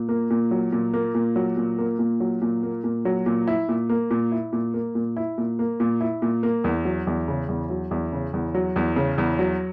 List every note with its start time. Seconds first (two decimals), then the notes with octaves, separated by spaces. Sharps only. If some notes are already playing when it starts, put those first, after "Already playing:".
Already playing: A#2
0.09 A#3
0.30 A#2
0.51 F#3
0.72 A#2
0.94 A#3
1.14 A#2
1.36 F#3
1.57 A#2
1.78 A#3
1.99 A#2
2.20 F#3
2.42 A#2
2.63 A#3
2.84 A#2
3.05 F#3
3.26 A#2
3.48 E4
3.69 A#2
3.89 A#3
4.11 A#2
4.32 E4
4.53 A#2
4.74 A#3
4.95 A#2
5.17 E4
5.38 A#2
5.59 A#3
5.80 A#2
6.01 E4
6.22 A#2
6.43 A#3
6.64 E2
6.85 F#3
7.07 E2
7.28 C#3
7.48 E2
7.70 F#3
7.91 E2
8.12 C#3
8.33 E2
8.55 F#3
8.76 E2
8.96 C#3
9.18 E2
9.39 F#3